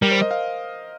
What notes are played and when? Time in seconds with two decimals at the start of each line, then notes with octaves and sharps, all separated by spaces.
0.02 G3 A#4
0.11 C5
0.22 D#5
0.31 F5